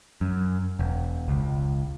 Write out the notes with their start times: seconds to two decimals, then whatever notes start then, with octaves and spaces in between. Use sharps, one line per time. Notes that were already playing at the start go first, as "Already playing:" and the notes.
0.21 F#2
0.79 E1
1.28 C#2